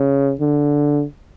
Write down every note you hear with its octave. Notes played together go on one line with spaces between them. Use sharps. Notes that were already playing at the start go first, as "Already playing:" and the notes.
Already playing: C#3
D3